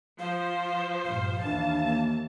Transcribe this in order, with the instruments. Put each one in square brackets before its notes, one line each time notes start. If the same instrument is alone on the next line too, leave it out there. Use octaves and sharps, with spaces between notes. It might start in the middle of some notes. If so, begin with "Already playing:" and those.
[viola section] F3 C5 [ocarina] F5
[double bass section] A#1 G2 [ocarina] F5
[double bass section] D#2 E3 [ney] D4 [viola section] A5
[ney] A#3